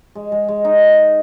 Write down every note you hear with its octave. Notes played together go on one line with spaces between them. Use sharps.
G#3
G#3
G#3
D#4